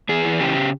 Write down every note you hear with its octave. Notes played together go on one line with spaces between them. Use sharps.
E2 G#4
E3
C#3 G4